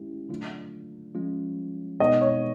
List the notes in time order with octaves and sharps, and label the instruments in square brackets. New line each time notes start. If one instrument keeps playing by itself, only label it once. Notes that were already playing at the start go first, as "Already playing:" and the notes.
Already playing: [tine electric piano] G#3 C#4 E4 G4
D3 F#3 A3 D4 F4
F3 G#3 C#4 F4
[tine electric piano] B2 G#3 B3 D#4 [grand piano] D#5
[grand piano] C#5